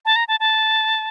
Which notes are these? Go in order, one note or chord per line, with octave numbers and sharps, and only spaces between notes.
A5
A#5
A5
A5